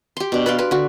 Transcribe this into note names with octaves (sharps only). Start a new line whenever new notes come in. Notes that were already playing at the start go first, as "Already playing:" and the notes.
G4 C6
B2 D4
B4 D5 F5 C6
B4 C6
D3 F#4